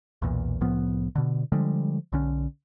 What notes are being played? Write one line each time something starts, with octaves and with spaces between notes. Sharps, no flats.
B1 E2 A#2
C2 A2 F3 B3
B2 D3
D3 F3 G3 G#3
B1 D3 C#4